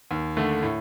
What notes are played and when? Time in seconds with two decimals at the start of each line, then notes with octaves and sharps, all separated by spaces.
0.11 D#2
0.37 D3 A3
0.63 A2